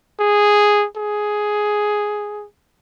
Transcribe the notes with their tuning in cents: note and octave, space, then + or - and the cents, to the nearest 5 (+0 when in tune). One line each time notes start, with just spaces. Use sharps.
G#4 -5
G#4 +5